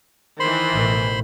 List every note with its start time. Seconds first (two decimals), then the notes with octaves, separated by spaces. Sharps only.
0.40 D#3 E3 C5 B5 C6
0.73 A1 B2